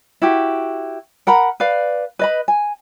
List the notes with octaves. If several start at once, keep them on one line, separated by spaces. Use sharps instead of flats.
E4 F#4 G4
A#4 F#5 A#5 B5
B4 D5 F5
B4 D#5 B5
G#5